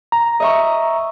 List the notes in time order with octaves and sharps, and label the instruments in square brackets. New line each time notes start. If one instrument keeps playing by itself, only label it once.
[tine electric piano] A#5
[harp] D#5 E5 C#6